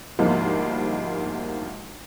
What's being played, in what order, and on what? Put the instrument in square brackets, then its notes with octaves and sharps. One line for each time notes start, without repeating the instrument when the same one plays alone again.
[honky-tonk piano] D2 G#2 F3 G3 G#3 A#3